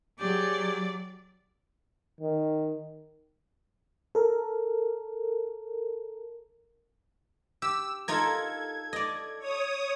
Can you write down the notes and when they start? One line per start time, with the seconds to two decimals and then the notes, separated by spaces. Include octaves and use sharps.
0.20 F#3 G4 G#4 D5
2.21 D#3
4.15 A4 A#4
7.62 G4 E6
8.08 D#4 F4 A4 A#4 G#6
8.93 D5 D#5
9.39 C#5 D#6